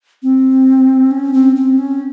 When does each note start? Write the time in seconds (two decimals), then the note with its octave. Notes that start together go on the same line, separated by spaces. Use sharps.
0.23 C4
1.11 C#4
1.33 C4
1.56 C4
1.78 C#4